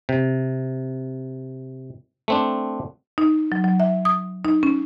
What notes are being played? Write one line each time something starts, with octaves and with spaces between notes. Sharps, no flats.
C3
A3 C4 D4
D#4
F#3
F#3
E5
D#6
D#4
C#4